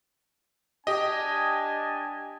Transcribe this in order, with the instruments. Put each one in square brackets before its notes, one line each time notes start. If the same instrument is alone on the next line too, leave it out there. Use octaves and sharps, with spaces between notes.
[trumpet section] D4 G#5 A5 [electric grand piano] G4 D#5